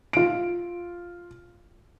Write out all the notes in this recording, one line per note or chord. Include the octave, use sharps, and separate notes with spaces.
F4 D7